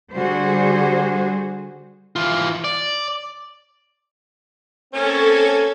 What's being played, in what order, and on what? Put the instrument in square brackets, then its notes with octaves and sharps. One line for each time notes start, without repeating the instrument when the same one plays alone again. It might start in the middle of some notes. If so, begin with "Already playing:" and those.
[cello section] D3 G3 F#4 G#4 C5
[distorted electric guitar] E3 F4
D5
[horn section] A#3 C4 C#4 [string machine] A4 G#6